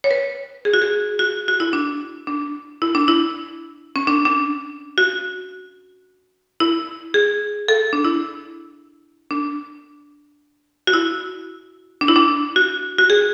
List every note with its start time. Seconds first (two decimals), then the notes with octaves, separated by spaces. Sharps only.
0.04 C#5
0.11 B4
0.65 G#4
0.74 F#4
0.82 G#4
1.19 F#4
1.48 F#4
1.60 E4
1.73 D4
2.27 D4
2.82 E4
2.95 D4
3.08 E4
3.96 C#4
4.07 D4
4.25 D4
4.98 F#4
6.60 E4
7.14 G#4
7.68 A4
7.93 D4
8.04 E4
9.31 D4
10.87 F#4
10.93 E4
12.01 D4
12.08 E4
12.16 D4
12.56 F#4
12.98 F#4
13.10 G#4